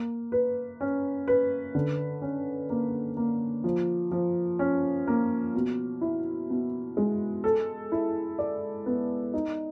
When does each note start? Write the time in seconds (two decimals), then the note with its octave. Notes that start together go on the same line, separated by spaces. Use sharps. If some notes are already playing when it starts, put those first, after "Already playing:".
Already playing: A#3
0.32 B4
0.81 C#4
1.28 B4
1.75 D3
2.22 C#4
2.70 A#3
3.17 A#3
3.64 F3
4.11 F3
4.59 C#4
5.07 A#3
5.55 B2
6.01 E4
6.50 B2
6.97 G#3
7.44 A4
7.92 E4
8.39 D5
8.86 B3
9.34 D#4